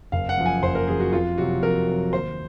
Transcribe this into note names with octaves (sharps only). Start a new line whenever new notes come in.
F#1 F5
F#5
F#2 F3
G#5
F#1 C5
A#4
F#2 F3 G#4
F#4
F2 F4
C3 F#3 F#4
F2 A#4
C3 F#3
D#2 C5